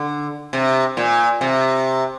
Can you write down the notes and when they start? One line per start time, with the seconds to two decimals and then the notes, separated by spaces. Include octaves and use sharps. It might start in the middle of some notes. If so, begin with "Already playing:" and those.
Already playing: D3
0.53 C3
0.97 A#2
1.41 C3